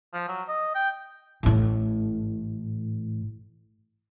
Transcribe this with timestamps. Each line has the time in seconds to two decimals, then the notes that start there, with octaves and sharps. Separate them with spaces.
0.14 F3
0.28 F#3
0.48 D#5
0.75 G5
1.43 A1 A2